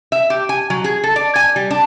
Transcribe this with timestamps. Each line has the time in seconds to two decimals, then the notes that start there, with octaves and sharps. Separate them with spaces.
0.12 E5
0.30 G4
0.49 G#5
0.70 F#3
0.84 G#4
1.04 A4
1.16 D5
1.36 G#5
1.56 G3
1.71 D4